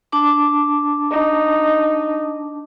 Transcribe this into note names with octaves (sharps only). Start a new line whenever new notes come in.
D4 A5 D6
D#4